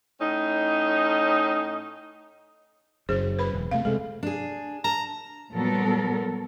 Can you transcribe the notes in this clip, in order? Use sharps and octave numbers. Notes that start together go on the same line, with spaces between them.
A2 C#4 D#4
F#1 F#2 G#4 C5
B4 B5
E1
C3 A3 F5
C3 G#3 A4
D4 G#4
A5 A#5
A#2 F#3 G3 B3 A4 A#4